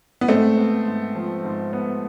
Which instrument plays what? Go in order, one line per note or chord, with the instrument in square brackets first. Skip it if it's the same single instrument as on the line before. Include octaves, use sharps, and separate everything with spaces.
[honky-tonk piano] B3
[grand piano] G#2 [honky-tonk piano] A3 C4
[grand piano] B3
G#2
F3
G#2
B3